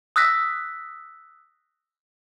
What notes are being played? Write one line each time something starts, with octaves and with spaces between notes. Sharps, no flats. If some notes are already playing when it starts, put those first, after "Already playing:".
D#6 E6 F#6 A#6 B6